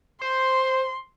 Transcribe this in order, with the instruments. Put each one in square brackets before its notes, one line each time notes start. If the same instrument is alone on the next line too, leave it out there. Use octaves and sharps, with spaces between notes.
[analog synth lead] C5 [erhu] C6